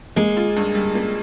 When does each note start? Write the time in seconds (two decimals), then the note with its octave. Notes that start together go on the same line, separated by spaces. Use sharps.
0.16 G#3 A#3
0.37 F4
0.56 G2
0.75 G3
0.95 A#3